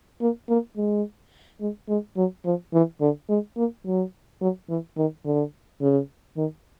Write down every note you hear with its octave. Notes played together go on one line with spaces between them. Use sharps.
A#3
A#3
G#3
G#3
G#3
F#3
F3
E3
D3
G#3
A#3
F#3
F#3
E3
D#3
D3
C#3
D#3